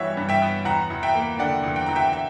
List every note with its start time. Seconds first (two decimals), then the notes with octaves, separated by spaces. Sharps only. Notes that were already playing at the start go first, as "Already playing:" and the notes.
Already playing: G2 E3 G3 B3 C#5 E5 F#5
0.17 G2
0.29 E5 G5
0.42 B3
0.65 E2 F#5 A#5
0.90 E2
1.03 E5 G5
1.15 A#3
1.39 D3 D5 F#5
1.63 E2
1.76 G5
1.86 E2 A#5
1.95 E5 G5
2.13 E5 G5